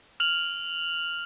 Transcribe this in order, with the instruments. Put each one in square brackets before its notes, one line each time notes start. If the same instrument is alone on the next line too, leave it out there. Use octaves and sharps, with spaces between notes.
[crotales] F6 F7 F#7